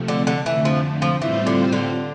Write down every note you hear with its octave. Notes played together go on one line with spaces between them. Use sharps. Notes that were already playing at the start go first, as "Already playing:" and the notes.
Already playing: C3 F3 A3
D3
D3
F2 D3 E3 A3
F3
F3
A2 E3 G3 C4 F4 C5
D3
D3